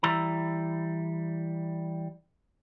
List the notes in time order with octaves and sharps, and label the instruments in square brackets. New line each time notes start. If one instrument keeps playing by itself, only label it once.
[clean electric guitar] E3 G3 E4 A#5